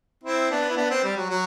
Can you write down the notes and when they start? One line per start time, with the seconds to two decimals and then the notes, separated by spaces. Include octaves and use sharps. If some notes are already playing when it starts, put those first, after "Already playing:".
0.24 C4 E4
0.51 B3 D4
0.70 E4
0.77 B3 D4
0.90 C4
1.04 G3
1.17 F#3
1.30 F#3